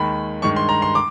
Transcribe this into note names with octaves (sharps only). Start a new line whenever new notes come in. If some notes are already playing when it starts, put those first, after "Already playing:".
Already playing: D#2 D#3 G#3 B5
G2 D#3 G#3 C#6
C6
A#5
C6
D6